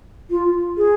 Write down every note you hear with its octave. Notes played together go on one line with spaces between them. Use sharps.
F4
G#4